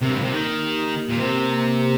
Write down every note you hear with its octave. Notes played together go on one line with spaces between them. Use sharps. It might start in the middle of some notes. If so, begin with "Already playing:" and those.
C3 A#4
G2
A#2
C3
D#3 A#3
G4
A#3
A#2
C3 A#4
A#3
G4